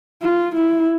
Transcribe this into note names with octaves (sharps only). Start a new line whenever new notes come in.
F4
E4